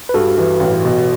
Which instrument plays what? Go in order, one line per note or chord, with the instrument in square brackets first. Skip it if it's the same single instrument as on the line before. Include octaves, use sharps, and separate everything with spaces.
[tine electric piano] B4
[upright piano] G2 [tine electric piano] F#4 A4
[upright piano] E3
A1
B2